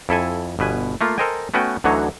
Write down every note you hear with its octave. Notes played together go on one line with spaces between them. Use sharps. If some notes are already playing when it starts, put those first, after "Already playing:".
F2 E4 A4 G#5
G1 B2 B4 G#5
A3 A#3 F4
A4 A#4 C5 D#5 G5 G#5
A3 B3 C#4 F#4 B4 G5
D2 D3 E3 F#3 D#4 C#5